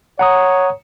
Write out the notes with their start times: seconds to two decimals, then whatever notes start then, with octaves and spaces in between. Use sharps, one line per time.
0.19 C#5 F#5 A#5 D#6